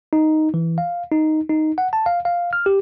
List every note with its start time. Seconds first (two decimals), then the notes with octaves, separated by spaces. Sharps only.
0.13 D#4
0.54 E3
0.78 F5
1.11 D#4
1.50 D#4
1.78 F#5
1.93 A5
2.06 F5
2.25 F5
2.53 F6
2.66 G4